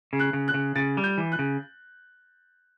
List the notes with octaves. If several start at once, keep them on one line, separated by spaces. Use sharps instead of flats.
C#3
F#6
C#3
F#6
C#3
C#3 A6
G3
G6
E3
F#6
C#3